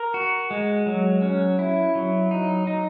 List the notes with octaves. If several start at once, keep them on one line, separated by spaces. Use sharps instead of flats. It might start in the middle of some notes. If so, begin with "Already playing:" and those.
Already playing: A#4
F#4
G#3
F#3
C#4
E4
F#3
D#4
D#4